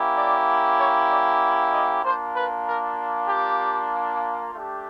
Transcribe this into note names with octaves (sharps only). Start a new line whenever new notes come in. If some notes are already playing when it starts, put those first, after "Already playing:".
Already playing: A#3 C#4 E4 G4
D5
C#5
D5
D#5
A#3 D4 F4 C5
B4
A#4
G4
A3 D4 G4